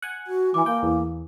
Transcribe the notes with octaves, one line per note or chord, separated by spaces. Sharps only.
F#5 G#5
F#4
E3 G#5 D6
A#3 G5
E2